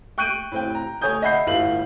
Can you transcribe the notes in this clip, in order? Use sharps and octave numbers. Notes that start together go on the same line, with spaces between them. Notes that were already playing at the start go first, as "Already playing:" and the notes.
G5 C#6 F#6 G6 D7 D#7
A2 C4 G5
A#5
A3 C#5 G#5 D#6 G6
D#5 E5 F#5 B5 G6 C7
G1 A2 E4 F4 F#7